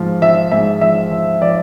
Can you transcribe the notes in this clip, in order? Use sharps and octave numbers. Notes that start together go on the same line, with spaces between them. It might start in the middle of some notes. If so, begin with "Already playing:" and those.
Already playing: G#2 F3
F3 E5
G#2 E5
F3 E5
F3
F3 D5